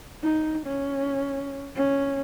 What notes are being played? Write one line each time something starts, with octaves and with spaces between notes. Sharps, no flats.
D#4
C#4
C#4